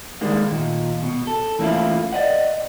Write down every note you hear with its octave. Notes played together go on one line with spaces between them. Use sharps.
D3 D#3 G3 G#3 A#3
D#2 A#2
B2
A4
E3 A3 A#3 C#4 E4 F4
D5 D#5 F#5